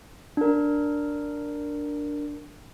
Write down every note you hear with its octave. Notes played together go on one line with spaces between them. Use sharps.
D4 A#4